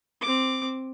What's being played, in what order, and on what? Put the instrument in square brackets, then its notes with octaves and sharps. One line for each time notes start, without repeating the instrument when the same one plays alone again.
[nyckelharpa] C4 D6